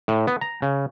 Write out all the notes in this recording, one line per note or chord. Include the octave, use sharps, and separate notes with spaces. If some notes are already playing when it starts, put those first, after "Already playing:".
A2
B3
A#5
C#3